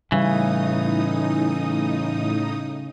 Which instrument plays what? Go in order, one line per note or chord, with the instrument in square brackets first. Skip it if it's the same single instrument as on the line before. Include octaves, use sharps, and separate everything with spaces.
[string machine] A2 D#4 D#6 [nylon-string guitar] C#3 [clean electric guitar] E3 [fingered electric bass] G3